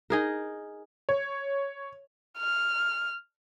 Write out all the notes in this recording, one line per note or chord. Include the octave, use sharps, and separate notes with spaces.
D#4 G#4 A#4
C#5
F6